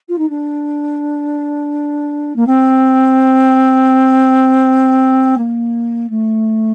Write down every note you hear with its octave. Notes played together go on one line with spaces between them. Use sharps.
F4
D#4
D4
A#3
C4
A#3
A3